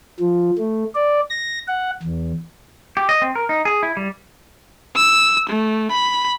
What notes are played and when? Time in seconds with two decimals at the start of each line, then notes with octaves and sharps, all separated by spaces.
0.20 F3
0.58 A3
0.95 D5
1.30 A#6
1.68 F#5
2.03 E2
2.97 G4
3.09 D#5
3.22 C4
3.35 A#4
3.49 D#4
3.65 G#4
3.83 E4
3.97 G3
4.96 E6
5.49 A3
5.91 B5